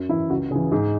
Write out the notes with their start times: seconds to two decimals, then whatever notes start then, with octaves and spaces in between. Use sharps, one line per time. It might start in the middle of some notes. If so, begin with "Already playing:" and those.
Already playing: F#2
0.09 E3 E4
0.30 C#2 F#4
0.51 C#3 G#4
0.55 E3
0.72 G#2 G#4